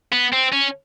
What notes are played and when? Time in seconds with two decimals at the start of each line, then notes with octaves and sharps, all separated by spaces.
0.12 B3
0.33 C4
0.53 C#4